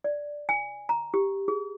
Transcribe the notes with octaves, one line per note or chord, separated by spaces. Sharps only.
D5
G#5
A#5
G4
G#4